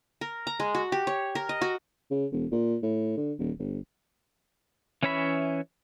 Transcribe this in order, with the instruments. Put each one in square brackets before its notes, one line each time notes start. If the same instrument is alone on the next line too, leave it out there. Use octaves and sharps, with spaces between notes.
[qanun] A#4
A#5
G#3
F#4
G4
C#5
A#4
D#5
F#4
[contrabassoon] C#3
E1
A#2
A2
D3
D#1
G1
[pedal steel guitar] E3 C#4 C#5 E5 B5